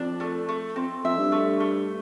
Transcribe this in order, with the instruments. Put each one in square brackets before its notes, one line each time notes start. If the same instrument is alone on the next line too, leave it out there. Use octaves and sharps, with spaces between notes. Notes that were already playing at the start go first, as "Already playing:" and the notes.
Already playing: [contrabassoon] F2 [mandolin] D4
[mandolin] A3
A3
[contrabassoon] F2 [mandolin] C4
[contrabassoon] F2 [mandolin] E5
[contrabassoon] G2
[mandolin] A3
A3